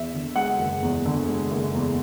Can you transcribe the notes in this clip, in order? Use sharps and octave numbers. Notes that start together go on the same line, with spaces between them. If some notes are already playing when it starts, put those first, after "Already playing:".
Already playing: E2 E5
D3
G#3 F#5
F#1
E2
D3
G#3
F#1
E2